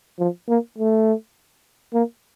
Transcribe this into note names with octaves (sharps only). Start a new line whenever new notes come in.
F3
A#3
A3
A#3